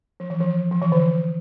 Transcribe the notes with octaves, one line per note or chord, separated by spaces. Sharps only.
F3
E3
F3
F3
E3
D3